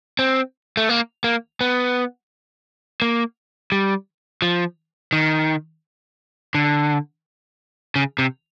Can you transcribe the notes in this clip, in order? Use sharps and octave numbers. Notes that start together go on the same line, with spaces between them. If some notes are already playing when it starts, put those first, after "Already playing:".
C4
A3
A#3
A#3
B3
A#3
G3
F3
D#3
D3
C#3
C3